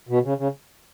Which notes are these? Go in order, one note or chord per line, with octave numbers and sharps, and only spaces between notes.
B2
C#3
C#3